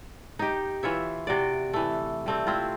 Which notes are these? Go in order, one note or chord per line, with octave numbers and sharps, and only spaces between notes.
D#4 G4
E3 F4 C#5 E5
C3 F#4 D5
E3 A3
G3 A3 C4
C4 E4 F4